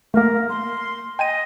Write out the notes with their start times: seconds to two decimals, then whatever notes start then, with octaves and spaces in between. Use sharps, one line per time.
0.14 A3 A#3 A#4
0.50 C6
1.19 D#5 G5 G#5 D#7